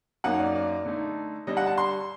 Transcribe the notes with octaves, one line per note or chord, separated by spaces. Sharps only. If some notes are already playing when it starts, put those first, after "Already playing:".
F#2 F#3 A#3 D#4 F#5
D5
D5
D3 A3 D#4
D3 G3 D4 D#5
F#5
A5
C6